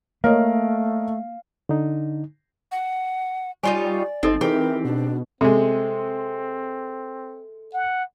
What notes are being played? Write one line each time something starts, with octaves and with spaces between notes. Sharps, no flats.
A3 A#3 A#4 C#5 D#5 F5
D3 D#4
F#5
G3 D#4 F4 C#5 D5 G#5
G1 C4 D#4 A4 D#5
E3 C4 G4 G#4 A#4
B2 D4
C3 G#3 C4 A4
F#5